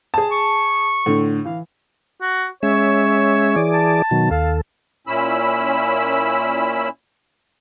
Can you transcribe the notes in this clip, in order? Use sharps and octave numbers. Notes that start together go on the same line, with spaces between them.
G#4 A5
C#6
A2 D3
E3 F5
F#4
G#3 C#4 C#5 E5
E3 G#4 D5
A5
B2 D#3 F#3
D#2 A4 F5
A#2 C#4 E4 B5 E6